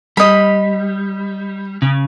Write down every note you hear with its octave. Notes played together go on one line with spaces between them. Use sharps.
G3 D#5 B5
C#3